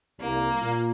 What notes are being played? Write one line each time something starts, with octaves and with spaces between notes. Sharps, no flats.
C2 A#3
A#2